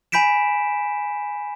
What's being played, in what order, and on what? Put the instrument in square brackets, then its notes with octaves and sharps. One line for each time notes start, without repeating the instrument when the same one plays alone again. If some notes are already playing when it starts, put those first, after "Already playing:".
[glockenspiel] G#5 B5 G6 B6 D7 E7